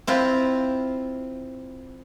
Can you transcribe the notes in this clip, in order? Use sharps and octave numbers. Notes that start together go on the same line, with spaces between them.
C4 E4 F4